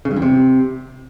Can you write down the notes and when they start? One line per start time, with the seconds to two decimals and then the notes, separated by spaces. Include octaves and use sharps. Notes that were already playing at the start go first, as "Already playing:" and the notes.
0.05 C#3
0.11 G2
0.16 E2
0.22 C3